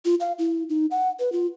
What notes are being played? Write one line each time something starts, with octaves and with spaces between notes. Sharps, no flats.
F4
F5
E4
D#4
F#5
B4
F4